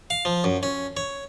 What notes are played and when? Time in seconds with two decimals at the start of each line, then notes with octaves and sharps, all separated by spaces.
0.10 F5
0.25 F3
0.44 F#2
0.63 C#4
0.97 C#5